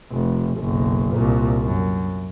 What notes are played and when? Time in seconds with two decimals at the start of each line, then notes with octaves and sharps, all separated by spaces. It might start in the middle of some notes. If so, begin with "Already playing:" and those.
0.12 F1
0.59 F#1 B1
1.13 C2 A#2
1.62 F#2